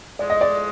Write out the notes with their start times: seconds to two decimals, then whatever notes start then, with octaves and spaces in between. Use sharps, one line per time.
0.19 A2 F3 G#3 D5
0.30 D#5
0.41 D5